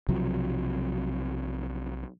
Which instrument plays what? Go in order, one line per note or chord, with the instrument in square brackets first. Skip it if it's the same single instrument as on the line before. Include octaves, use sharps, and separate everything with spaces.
[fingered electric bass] B1 C3 F3 F#3